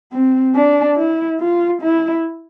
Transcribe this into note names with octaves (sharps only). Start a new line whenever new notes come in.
C4
D4
E4
F4
E4